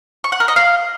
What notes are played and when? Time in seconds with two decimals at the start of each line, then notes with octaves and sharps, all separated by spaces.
0.24 C#6
0.32 F#5
0.40 A#4
0.48 D#5
0.56 F5